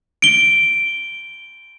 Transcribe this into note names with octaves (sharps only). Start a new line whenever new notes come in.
D7 G7